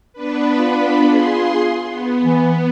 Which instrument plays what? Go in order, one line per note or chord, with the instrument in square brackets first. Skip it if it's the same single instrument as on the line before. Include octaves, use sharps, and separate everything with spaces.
[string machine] B3 D4 B4
[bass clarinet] F4
[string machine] G#4 C6
B3
[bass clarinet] E3